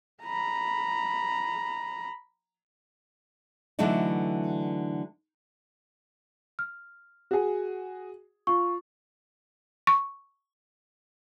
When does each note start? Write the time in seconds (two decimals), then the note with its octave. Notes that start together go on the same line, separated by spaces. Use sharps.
0.23 A#5 B5
3.79 D3 E3 F#3 A3 D#4 E4
6.59 F6
7.31 F#4 G#4
8.47 F4 C#6
9.87 C#6